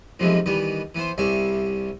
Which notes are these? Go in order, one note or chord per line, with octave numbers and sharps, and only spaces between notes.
B1 F2 C3 E3 F3 G#3
D#3 E3 G3 B3
E3 B3 C5
C2 C3 G3 C#4 E5